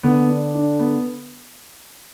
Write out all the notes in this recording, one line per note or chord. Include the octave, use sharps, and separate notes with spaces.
D3 B3
D4
D4
B3